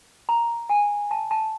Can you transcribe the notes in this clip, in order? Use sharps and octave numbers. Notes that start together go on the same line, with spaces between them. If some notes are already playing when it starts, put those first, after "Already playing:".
A#5
G#5
A5
A5